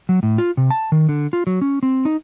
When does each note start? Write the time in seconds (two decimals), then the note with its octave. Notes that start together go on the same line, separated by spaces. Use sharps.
0.09 F#3
0.23 A2
0.38 F4
0.57 C3
0.70 A5
0.92 D#3
1.09 D3
1.33 F4
1.47 F#3
1.61 C#4
1.83 C4
2.05 D#4